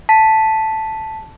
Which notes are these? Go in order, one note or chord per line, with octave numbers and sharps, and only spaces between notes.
A5 B6